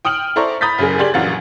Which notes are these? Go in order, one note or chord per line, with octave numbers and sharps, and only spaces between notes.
G5 D#6 F6 D7 F#7
E4 A4 C5 D5 A#5 C#6
A#5 B5 D#6 G6 A6 B6
F#1 F#2 G#4 A#4
G4 G#4 D5 C6 G#6 F#7
A#1 F#2 E3 F5 F#5 A6